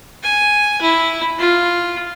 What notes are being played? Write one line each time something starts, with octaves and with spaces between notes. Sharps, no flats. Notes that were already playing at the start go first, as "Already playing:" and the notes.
G#5
E4
F4